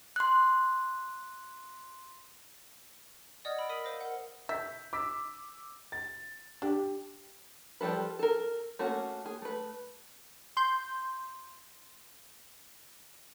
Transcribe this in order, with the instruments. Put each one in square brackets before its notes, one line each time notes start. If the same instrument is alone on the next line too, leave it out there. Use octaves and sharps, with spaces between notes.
[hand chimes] C6 F#6
[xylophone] D5 D#5 F#5 D#6 F6 G#6
D5 B5 E6 D7
A#4 D#6 B6 D#7 F#7
C5 F5 E6 A#6
A#4 F#5
[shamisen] E5 [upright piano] G6 B6
[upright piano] D6 E6 B6
A6
[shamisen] D4 [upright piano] G4
[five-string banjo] F3 G3 G#3 A4 B4
A4 A#4
A3 A#3 C#4 F#4
G#4
A3 B4
[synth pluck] C6 G6